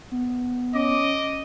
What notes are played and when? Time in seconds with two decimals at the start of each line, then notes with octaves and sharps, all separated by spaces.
0.11 B3
0.75 C#4 D#5 D6